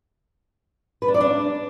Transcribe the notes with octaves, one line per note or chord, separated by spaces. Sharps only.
B4
D4
D5
D4